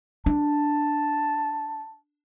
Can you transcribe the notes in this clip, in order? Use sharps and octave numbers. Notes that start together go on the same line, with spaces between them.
D4 A5